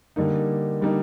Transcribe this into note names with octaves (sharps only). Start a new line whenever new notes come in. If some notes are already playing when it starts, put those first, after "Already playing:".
D3 G3 A#3 D#4
D3 G3 A#3 D#4